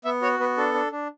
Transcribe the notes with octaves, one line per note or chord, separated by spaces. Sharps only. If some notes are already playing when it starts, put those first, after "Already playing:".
B3 E5
F#4 C#5
B3 B4
D4 A4
D4
D4